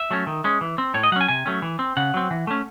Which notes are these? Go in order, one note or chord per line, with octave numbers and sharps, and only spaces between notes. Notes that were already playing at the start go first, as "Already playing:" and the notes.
Already playing: E5
F#3 A3 C#4
D#3
G#3 C#4
E3
C4
A2 C#5
D#5
F#3 C#4 F#5 G#5
C3 G#5
F#3 A3 C#4
E3
C4
C#3 F#5
F#3 C4
E3
A3 C#4